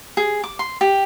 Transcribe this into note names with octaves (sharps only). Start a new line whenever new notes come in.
G#4
D6
C6
G4